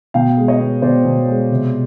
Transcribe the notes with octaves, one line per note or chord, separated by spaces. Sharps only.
B2 F5 G5
G#3
C#5 D#5
B3
B2 C5 D5
B2
G#3
C3